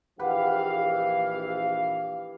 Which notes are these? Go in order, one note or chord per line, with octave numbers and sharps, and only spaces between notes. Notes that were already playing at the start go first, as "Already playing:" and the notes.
A#1 E3 G4 B4 F5 F#5